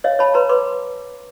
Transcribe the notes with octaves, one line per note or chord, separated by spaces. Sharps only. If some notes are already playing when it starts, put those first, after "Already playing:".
C#5 D#5 F5
C#5 A5 B5
B4 A#5 C6
B4 C6 D6